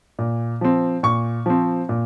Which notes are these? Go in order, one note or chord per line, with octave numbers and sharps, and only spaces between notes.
A#2
F3 C4
A#2 C#6
F3 C4
A#2